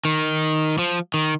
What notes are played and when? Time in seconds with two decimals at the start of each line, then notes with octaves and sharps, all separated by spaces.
0.05 D#3
0.78 F3
1.14 D#3